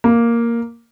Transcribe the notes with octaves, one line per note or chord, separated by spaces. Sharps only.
A#3